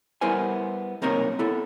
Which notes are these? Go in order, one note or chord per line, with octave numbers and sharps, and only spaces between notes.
G3 B3 E4 A#4 C5 G#5
B1 C3 A#3 D#4 A#4 C#5
B3 E4 A4